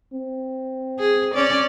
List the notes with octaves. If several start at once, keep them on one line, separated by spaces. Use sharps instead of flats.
C4
G#4
C#4 D5